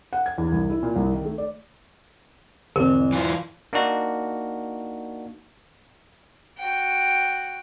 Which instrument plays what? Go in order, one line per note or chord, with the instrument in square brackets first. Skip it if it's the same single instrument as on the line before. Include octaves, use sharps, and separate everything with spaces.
[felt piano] F#5
G#6
E2
C2
E4
A#2
C2
D#3
A3
D5
[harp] E2 G#2 B2 [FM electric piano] D3 C4 [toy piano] A#4
[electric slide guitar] E3 F4
[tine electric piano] A#3 D4 D#4 F#4
[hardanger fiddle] F#4 G5